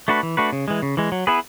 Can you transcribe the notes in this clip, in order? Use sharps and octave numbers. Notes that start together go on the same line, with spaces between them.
A3 D4 F#4 B4
E3
A3 D4 F#4 B4
C#3
E3 G#3
C#3
E3 G#3
F#3
B3 E4 G#4 B4